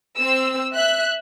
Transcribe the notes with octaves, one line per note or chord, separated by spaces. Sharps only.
C4 E6
E5 F#6